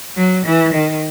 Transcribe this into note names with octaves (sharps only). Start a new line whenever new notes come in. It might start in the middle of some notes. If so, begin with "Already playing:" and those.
F#3
E3
D#3